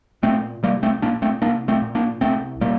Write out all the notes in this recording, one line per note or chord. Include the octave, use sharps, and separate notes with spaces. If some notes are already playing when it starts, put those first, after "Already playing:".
A#2 A3 C4
C2 G3 A#3
A3 C4
A#2 A#3 D4
A3 C4
C2 A#3 D4
A3 C4
A#2
A#3 D4
C2 A3 C4
A#2 G3 A#3